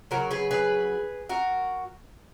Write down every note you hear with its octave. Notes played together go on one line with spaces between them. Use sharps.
C#3 F#3 F#4 A#4
G#4 B4
G#4 B4
F#4 A#4